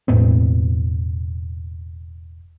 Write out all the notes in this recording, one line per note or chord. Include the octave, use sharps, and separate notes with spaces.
E1 A2 B3 C4